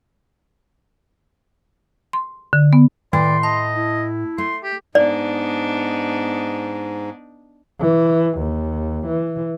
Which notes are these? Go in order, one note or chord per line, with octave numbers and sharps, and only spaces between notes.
C6
D3
B3
A2 D#3 D5 C6
D#5 A5
E4
A3 C6
G4
G#2 B3 D4 D#4 D5
E3
D#2
E3